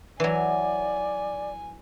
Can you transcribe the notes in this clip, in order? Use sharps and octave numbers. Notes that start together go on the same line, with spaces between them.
E3 F#3 D5 G#5